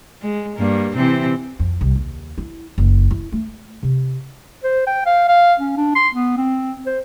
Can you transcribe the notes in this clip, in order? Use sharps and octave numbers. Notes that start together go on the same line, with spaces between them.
G#3
G2 A#3
C3 E3 C4
F2
C2
D#2
E4
F#1
E4
A3
C3
C5
G5
F5
F5
C#4
D4
C6
B3
C4
C5